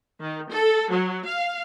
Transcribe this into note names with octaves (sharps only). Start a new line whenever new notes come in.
D#3
A4
F#3
F5